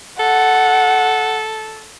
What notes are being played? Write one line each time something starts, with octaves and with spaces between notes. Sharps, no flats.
A4 F#5